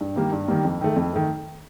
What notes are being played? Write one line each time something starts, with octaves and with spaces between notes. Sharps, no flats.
G2
D#3 G3 A#3
G2
D#3 G3 A#3
F2
D#3 A3
F2
D#3 A3